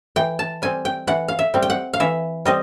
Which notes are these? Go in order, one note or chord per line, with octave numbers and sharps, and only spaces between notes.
E3 G5
A5
G3 C4 G#5
G5
E3 F#5
F5
E5
G3 C4
G5
F#5
F5
E3 E5
G3 C4 D#5